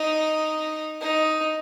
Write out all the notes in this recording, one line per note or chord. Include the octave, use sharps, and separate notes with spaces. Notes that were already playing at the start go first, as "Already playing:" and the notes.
Already playing: D#4
D#4